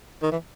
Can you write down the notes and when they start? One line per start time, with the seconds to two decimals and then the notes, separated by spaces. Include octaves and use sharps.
0.22 D#3
0.32 E3